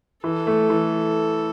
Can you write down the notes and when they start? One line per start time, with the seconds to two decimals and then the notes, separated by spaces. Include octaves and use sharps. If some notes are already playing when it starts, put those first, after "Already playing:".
0.24 E3 A4
0.47 A3
0.70 E3